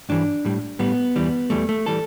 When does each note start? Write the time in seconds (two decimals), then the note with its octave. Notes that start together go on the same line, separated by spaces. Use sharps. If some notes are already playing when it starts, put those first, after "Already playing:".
0.09 G2 E3 G3 D4
0.45 A2 G3
0.79 A2 G3 B3
1.16 E2 E3 G3
1.50 E2 E3 G3 A3
1.69 A3
1.86 E3 G3 A4